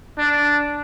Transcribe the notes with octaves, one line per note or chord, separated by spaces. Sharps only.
D4